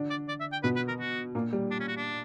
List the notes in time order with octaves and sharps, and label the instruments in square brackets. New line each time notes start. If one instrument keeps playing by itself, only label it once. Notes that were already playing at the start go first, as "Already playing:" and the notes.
Already playing: [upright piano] D3 D4
[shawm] D5
D5
E5
G5
[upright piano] B2 B3 [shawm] B4
[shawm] B4
A#4
F#4
[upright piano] A#2 A#3
G3
[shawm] D4
C#4
F#4
D4